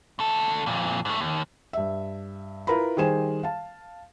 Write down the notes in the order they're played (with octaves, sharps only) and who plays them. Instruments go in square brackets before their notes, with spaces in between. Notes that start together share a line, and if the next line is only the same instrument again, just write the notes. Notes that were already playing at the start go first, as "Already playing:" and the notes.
[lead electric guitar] D2 A4
F2 A#2
G#2 A3
D#2
[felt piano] G2 E5
E4 F4 A#4 B4 A#5 B5
D#3 G3 G#4 C5 G#5 E7
F5 A5